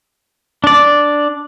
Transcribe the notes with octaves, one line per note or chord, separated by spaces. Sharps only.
D4 D5